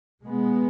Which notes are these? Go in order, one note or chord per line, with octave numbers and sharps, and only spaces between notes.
B2 G#3 B3